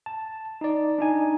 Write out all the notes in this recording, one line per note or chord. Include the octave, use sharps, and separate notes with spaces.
A5
D#4 D5
D4 D#4 G#5